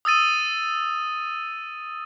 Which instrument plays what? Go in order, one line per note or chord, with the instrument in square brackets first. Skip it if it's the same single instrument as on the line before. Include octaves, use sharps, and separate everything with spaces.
[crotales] D#6 E6 A6 D#7